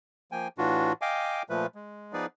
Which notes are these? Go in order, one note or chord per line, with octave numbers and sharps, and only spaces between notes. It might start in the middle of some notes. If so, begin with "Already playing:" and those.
F3 A#3 G5 G#5
A2 E3 D4 F4 F#4
D#5 F5 G5 G#5 D6
A#2 F3 A3 B4
G#3
F3 B3 D#4 G#4 B4 D5